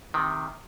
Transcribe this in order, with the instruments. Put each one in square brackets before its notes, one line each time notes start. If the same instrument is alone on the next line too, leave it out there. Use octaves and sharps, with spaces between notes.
[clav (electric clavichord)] C3 D#3